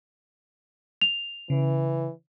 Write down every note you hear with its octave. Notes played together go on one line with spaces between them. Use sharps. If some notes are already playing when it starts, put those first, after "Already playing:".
F7
C#3 E3